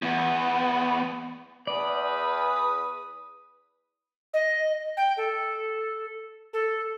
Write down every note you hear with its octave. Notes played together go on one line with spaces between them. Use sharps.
E2 B3
E2 B4 D5 D#6
D#5
G5
A4
A4